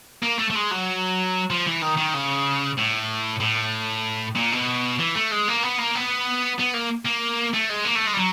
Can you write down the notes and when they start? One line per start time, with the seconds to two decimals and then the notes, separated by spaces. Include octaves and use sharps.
0.23 A#3
0.39 A3
0.50 A3
0.55 G#3
0.71 F#3
1.50 F3
1.67 E3
1.82 D#3
1.97 D#3
2.14 C#3
2.77 A2
3.40 A2
4.35 A#2
4.52 B2
4.99 E3
5.15 A3
5.31 G#3
5.48 A#3
5.63 B3
5.78 A#3
5.95 B3
6.59 B3
6.74 A#3
7.05 A#3
7.53 A3
7.69 G#3
7.85 A#3
7.95 A3
8.07 G#3
8.13 G3
8.17 F#3